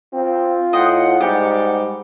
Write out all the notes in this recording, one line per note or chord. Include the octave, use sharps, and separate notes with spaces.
C4 F4
A2 D#5 F#5 G5 C6
G#2 G3 G4